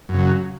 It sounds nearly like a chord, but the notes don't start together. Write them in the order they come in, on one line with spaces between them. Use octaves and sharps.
F#2 C#3 F#3